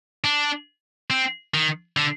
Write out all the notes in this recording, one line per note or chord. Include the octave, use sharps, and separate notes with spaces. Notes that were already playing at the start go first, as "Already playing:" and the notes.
D4
C4
D#3
D3